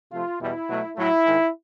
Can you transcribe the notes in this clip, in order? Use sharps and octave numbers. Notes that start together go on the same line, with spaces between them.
C3 F3 A3 F4
E2 B2 G3 E4
B2 F#3 A3
A2 F#3 A3 E4
G#2 D#3 G#3